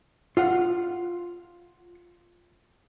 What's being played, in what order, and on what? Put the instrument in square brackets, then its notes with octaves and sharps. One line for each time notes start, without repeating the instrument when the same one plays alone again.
[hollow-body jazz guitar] F4 F5 F#5